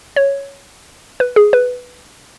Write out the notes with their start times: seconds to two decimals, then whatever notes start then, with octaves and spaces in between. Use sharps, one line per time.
0.16 C#5
1.20 B4
1.36 G#4
1.53 B4